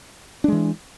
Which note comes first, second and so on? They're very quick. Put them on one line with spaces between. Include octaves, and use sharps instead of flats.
D4 G#3 E3